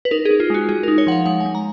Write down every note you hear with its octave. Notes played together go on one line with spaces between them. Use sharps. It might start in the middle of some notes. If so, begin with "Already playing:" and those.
B4
D#4 A#4
G#4
D#4
F4
G#3 F#4
G#3 G#4
A#4
D#4
C#5
F3 F#5
F5
G#3 F#5
G#5
G#3
A#5